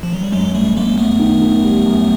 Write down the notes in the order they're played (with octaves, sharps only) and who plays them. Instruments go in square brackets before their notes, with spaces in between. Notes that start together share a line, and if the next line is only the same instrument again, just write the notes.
[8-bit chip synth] F3
F#3
G3
[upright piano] F#2 [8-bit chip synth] F#3 G#3
[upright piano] F#2 [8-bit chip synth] G3 A3
[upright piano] F#2 [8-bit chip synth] G#3 A#3
[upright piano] F#2 [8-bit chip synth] A3 B3
[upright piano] D#3
D#3
G3
F#2